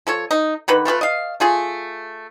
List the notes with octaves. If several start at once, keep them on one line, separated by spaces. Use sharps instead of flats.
F3 A4 C#5
D#4
D3 D#3 B4
A3 F4 G4 B4
D#5 F5
A3 F4 G#4